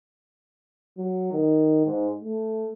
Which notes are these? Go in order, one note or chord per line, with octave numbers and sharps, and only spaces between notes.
F#3
D#3
G#2
A3